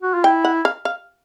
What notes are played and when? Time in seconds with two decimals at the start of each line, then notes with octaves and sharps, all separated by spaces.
0.02 F#4
0.14 F4
0.24 E4 G5
0.45 F#5
0.65 F5
0.85 F5